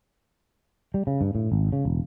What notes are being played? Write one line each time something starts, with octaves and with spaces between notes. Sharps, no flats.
G3
C#3
G2
A2
G#1
C#3
E1